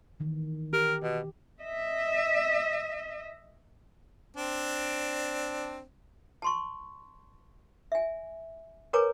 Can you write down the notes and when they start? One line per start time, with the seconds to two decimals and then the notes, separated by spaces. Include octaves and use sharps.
0.20 D#3 E3
0.73 G4 A#4
1.03 B2
1.62 D#5 E5
4.36 C4 D4
6.42 A5 C6 C#6
7.92 E5 G#5
8.93 A#4 B4 C#5 G#5 A#5 D6